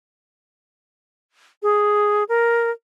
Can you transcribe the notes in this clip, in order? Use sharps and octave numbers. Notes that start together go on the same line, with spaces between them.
G#4
A#4